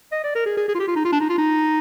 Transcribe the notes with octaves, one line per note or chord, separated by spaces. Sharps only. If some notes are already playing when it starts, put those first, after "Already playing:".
D#5
D5
A#4
G#4
G#4
G#4
F4
G4
F4
D#4
F4
D4
D#4
F4
D#4